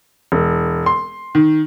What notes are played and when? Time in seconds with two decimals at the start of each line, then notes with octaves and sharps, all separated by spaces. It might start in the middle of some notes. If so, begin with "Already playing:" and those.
0.32 E1
0.86 C6
1.35 D#3